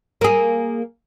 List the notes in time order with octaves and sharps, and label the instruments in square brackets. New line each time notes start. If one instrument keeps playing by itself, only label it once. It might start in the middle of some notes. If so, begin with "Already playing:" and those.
[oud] A#3 G#4